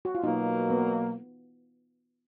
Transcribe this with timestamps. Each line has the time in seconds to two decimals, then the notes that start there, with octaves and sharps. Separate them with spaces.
0.05 F#4
0.15 F4
0.23 B2 F#3 A#3 D#4
0.70 B3